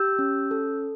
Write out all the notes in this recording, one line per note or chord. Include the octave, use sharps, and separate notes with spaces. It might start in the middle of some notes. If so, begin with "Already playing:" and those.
Already playing: G4 E6 G6
C#4
A4